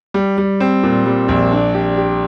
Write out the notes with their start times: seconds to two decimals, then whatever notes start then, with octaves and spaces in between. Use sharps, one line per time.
0.14 G3
0.38 G3
0.60 C4
0.83 A#2
1.06 G3
1.28 A#1
1.51 D4
1.74 G4
1.97 G4